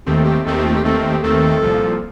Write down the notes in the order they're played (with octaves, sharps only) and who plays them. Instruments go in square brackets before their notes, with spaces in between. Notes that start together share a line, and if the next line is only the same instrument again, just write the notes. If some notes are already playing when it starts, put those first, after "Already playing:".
[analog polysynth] D#2 D#3 A3 C4 [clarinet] G4
[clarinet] A4
G4
[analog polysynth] D#2 D#3 A3 C4 [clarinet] A4
[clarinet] G4
F4
G4
[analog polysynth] D#2 D#3 A3 C4 [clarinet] A4
[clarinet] G4
[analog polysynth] D#2 D#3 A3 C4 [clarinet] A4
[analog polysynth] C2 A#2 F3